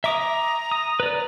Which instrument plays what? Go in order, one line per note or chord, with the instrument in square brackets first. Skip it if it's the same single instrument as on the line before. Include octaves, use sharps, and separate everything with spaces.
[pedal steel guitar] E5 D6 D#6 [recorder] A#5
[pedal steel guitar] D#6
B4 D5